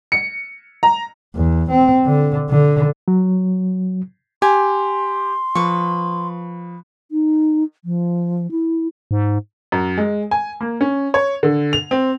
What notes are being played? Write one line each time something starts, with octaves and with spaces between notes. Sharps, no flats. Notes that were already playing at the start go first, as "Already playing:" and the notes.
C#7
A#5
E2
C4
D3
D3
F#3
G4 G#5 C6
F3 B4 C#6
D#4
F3
E4
G#2
F#2
G#3
G#5
A#3
C#4
C#5
D3
F7
C4